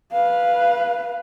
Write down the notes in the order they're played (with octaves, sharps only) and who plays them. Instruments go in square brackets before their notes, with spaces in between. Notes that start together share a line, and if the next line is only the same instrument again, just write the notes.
[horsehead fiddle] B4 F5